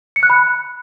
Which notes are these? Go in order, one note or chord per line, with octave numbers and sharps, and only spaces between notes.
C#7
F#6
B5